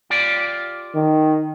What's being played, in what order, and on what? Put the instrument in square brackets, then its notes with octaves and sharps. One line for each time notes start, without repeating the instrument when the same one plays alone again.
[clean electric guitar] F4 G4 D5
[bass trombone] D#3